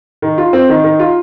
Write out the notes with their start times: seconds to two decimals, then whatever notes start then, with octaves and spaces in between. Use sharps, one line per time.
0.22 D#3
0.38 F4
0.53 C4
0.69 D#3
0.84 D#3
0.99 F4